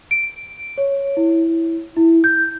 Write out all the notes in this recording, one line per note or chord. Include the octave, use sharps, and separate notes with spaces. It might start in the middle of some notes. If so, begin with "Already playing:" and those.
D7
C#5
E4
E4
G6